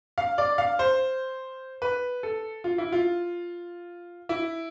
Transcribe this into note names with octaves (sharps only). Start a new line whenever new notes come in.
F5
D5
F5
C5
B4
A4
F4
E4
F4
E4